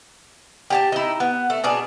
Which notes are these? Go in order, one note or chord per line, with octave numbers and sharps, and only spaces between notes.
G4 G5 A5
D#4 E4
B3
A3
B2 D4 G#4